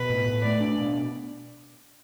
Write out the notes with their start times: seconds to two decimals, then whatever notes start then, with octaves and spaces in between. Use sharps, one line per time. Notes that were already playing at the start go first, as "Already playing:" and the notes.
Already playing: B2 B4
0.10 A2
0.28 A2
0.44 A3 D5
0.61 D4
0.79 B2